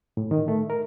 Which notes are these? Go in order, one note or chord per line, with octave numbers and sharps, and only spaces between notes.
A2
D#3
A3
A#4